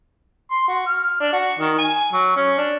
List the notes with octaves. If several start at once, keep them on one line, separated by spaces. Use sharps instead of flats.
C6
F#4
F6
D4
F#4
D#3
G#5
F#3
C#4
D4